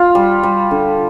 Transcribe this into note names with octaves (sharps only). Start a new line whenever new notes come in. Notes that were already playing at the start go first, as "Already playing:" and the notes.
Already playing: F4
G3
G3
D3